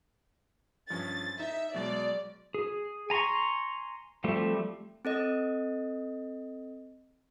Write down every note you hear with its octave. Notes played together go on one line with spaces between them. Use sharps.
G2 F3 C#4 A6
D#4 E5
B2 F#3 G#3 D5
G#4
G#5 A#5 C6 C#6
F3 G3 A3 C4
C4 A4 D#5